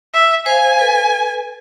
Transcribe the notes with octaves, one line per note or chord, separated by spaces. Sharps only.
E5
C5 F5 G#5
A4 B4